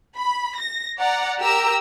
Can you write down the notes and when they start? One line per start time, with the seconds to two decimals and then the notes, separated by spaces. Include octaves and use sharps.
0.17 B5
0.59 A#6
0.98 D5 F#5 A#5
1.43 G4 A#4 A#5 E6